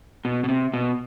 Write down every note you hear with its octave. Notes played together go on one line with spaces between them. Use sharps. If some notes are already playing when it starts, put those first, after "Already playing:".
B2
B2
C3
B2